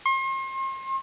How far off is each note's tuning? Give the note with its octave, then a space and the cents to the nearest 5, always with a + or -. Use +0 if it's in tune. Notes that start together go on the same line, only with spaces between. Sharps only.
C6 +40